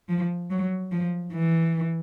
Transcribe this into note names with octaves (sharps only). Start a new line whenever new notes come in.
F3
F#3
F3
E3